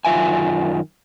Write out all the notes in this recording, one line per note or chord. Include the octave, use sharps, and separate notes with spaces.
F#2 D#3 F4 E5 G#5